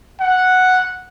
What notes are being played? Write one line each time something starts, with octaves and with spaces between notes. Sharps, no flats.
F#5